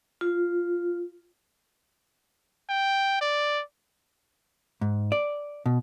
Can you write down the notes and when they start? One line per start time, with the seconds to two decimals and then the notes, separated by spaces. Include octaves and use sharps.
0.21 F4
2.69 G5
3.21 D5
4.81 G#2
5.12 D5
5.66 B2